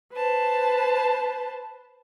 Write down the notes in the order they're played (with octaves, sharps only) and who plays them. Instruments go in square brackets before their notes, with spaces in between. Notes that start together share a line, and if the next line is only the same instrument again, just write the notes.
[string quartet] B4 C5 A5